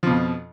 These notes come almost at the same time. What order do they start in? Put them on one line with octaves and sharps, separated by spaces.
F3 B2 F2